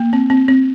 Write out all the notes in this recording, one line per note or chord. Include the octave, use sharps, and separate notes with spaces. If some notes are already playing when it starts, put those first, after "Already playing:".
Already playing: A#3
C4
C4
C4